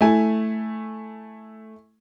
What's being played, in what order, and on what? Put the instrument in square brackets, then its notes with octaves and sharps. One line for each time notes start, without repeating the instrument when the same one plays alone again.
[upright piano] A3 E4 G#5